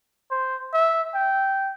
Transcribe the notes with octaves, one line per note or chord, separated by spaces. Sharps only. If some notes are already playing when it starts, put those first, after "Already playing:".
C5
E5
G5